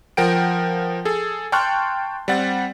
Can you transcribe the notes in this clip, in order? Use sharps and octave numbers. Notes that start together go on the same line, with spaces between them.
F3 A#4 F#5 G5 D7
G#4 A4
G5 A5 C6 C#6 F6 F#6
G3 C4 F#5 A6